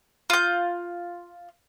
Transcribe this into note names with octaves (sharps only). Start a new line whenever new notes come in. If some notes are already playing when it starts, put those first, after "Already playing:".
F4 G6